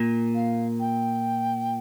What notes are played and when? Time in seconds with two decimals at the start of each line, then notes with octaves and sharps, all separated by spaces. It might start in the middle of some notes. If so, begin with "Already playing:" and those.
Already playing: A#2
0.34 F5
0.79 G5